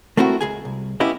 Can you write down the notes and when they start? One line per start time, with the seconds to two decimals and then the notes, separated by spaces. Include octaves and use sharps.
0.17 A3 A#3 C4 E4 F#4
0.41 C#2 G#4 G#5
0.65 C2
1.00 A#3 B3 C#4 E4 G4 D#5